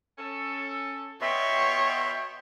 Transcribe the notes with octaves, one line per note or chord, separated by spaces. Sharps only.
C#4 A4
B2 B3 C#5 E5 G5 C6